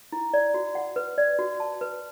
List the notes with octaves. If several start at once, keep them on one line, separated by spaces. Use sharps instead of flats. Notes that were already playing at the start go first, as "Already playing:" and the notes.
E4
D5
F#4
F#5
B4
D5
F#4
A5
B4